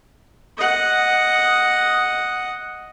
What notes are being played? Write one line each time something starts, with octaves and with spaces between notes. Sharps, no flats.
D#5 F#5